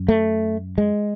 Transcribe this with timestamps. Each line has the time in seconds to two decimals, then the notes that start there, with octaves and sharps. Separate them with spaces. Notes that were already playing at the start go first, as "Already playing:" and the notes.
Already playing: F#2
0.08 A3
0.78 G#3